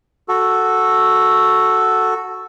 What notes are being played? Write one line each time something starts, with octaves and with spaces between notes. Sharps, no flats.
F#4 A4